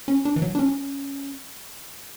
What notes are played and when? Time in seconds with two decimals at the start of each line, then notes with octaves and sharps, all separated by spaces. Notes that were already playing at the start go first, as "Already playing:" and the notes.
0.08 C#4
0.25 D4
0.36 E3
0.42 F#3
0.55 D4
0.59 C#4